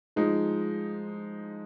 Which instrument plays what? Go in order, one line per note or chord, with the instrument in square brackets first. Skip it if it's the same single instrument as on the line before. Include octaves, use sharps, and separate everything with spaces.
[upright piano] F3 G#3 D#4